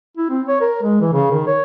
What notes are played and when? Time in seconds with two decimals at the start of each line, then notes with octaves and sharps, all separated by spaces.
0.17 E4
0.30 C4
0.48 C#5
0.61 A#4
0.83 G#3
1.01 E3
1.13 C#3
1.31 D#3
1.47 C#5